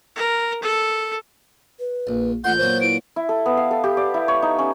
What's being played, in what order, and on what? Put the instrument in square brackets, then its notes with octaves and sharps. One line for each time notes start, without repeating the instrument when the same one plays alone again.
[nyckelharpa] A#4
A4
[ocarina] B4
[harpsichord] A#1
[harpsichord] A1 C6 [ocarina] F4 [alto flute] F#5 [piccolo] G6
[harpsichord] A#2 F#3 B3 [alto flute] C5
[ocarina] E4 [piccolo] D7
[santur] E4
A4
B3
F5
A4
G4
D5
E4
C#5
D#4
C#4